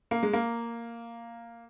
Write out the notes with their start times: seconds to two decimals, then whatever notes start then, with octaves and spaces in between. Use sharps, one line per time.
0.11 A#3
0.23 G#3
0.33 A#3